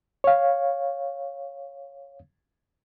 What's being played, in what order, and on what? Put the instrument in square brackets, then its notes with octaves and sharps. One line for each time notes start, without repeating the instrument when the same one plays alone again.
[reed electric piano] C#5 F5